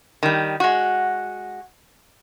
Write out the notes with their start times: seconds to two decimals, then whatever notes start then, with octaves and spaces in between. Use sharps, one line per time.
0.23 D#3 G3
0.60 G#3 F#4